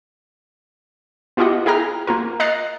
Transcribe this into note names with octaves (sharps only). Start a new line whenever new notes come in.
B3 E4 F4 G4 D#5 F#5
E4 G#4 G5 A#5 F6
A#3 F4 A#4
D#5 A#5 F#6 A6 C7